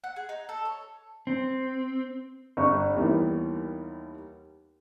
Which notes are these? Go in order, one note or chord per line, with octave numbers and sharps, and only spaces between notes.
F#5
G#4
D#4
A4
C#5
C4
G1 C#6
D#2 E3 G3 A#3 B3